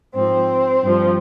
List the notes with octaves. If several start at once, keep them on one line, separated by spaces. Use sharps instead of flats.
G#2 F3 C4
G2 F3